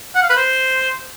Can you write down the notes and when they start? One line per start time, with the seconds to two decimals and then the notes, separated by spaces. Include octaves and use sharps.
0.15 F#5
0.22 F5
0.30 B4
0.37 C5